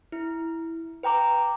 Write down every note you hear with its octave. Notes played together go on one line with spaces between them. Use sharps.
E4
B4 G5 A#5 D6